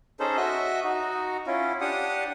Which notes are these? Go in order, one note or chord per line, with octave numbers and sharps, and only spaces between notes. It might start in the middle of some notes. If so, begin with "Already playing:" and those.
C#4 D#4 G#4 A4 C5
F#4 D#5 E5
D#4 F#4
C#4 E4 F4
D4 G4 F#5 D#6